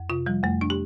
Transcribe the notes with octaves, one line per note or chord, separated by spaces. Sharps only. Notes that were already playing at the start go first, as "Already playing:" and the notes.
Already playing: F2
C3 F4
F3 G3
F2 A3
D4
G4